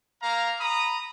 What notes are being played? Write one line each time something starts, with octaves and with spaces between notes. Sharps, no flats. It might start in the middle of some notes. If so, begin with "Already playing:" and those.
A#3 F5 A#5
A#5 B5 D#6